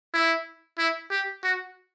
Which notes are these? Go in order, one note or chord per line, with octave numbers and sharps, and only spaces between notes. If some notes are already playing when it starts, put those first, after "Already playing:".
E4
E4
G4
F#4